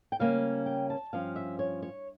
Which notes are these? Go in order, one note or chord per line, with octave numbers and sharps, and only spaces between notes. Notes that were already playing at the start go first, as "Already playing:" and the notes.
G5
C#3 G3 A#3 C#4 F5
G5
A5
G2 F3 C#4 F5
E5
C#5
C#5